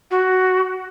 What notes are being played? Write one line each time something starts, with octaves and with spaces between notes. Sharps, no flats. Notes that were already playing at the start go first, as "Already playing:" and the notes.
F#4